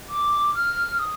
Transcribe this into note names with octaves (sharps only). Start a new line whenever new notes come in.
D6
F6
D#6